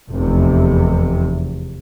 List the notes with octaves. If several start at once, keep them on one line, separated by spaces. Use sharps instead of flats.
F1 E2 C3